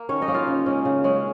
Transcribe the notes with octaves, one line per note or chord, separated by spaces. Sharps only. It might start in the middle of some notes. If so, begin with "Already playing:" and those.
Already playing: A#3
D#3 C#4 C#5
D#4 D#5
A#3 C#4
F4 F5
C#3
G#3 C#4
C#3
G#3 C#4